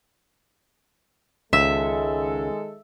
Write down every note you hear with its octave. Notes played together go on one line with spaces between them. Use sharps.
C#2 D#3 G#3 A4 E5